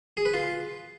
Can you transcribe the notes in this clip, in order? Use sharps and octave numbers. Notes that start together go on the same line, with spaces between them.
G#4
B4
F4